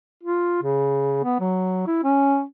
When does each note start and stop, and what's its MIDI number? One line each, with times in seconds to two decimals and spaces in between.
0.23 0.59 65
0.63 1.21 49
1.24 1.38 59
1.40 1.84 54
1.87 2.00 64
2.04 2.43 61